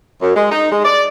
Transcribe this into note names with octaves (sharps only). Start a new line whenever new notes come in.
F#2
G#3
D#4
G#3
D5